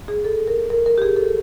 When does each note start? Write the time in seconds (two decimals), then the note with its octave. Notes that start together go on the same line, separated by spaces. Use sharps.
0.08 G#4
0.24 A4
0.48 A#4
0.70 A#4
0.86 A#4
0.98 G4
1.02 G#4
1.16 A4